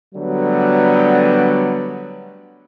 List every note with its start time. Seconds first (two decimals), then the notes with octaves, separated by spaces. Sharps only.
0.15 D3 F#3 G3 A3 B3